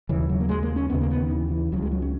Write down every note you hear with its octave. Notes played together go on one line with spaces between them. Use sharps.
D#2 C#3 E3
F#3
A#3
G#3
A#3
C#4
D#2 C#3 B3
A#3
B3
D#3
E3
E3
C#2 C#3 F#3
G#3
F#3
C#4